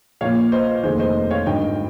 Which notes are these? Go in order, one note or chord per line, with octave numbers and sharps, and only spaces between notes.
A#1 A#2 C#5 F5
C5 D#5
F1 D#2 D#3 G#4 C5
C5 D#5
C#5 F5
G#1 G2 D#3 D#5 G5